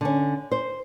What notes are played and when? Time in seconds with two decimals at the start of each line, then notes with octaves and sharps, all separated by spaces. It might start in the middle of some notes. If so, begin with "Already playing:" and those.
0.01 D3 C#4
0.52 C5